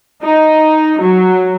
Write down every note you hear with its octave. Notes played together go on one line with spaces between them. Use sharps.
D#4
F#3